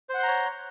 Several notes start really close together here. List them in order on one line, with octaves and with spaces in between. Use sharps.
C5 F#5 C6 A#5 C#5